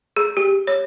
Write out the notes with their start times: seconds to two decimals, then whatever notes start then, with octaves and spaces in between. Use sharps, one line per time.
0.17 G#4
0.37 G4
0.67 C#5